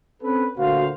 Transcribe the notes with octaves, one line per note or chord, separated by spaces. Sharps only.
C4 C#4 A4 B4
D2 A#2 F#4 C5 F5